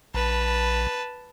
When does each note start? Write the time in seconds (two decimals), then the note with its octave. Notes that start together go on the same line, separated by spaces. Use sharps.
0.15 A#1 B4 A5